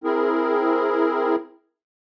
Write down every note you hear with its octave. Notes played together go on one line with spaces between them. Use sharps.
C4 E4 G#4 A#4